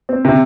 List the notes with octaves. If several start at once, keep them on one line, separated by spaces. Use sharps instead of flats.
C4
C3